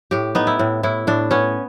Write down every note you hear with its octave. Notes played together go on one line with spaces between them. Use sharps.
A2 G4
B3 D#4
E4
A2
A2 E4
A2 D4
B3 C#4